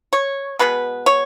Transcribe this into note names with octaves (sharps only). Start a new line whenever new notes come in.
C#5
B2 G#3 B3 B4
C#5